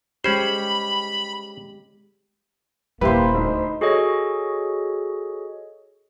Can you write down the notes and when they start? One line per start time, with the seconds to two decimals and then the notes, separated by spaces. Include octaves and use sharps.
0.24 G#3 C#4 G4 C5 B5
3.01 D#1 A#3 C#4 E4 G4 B4 C5 B5
3.35 D2 D#4
3.81 F#4 G#4 A4 C#5 D#5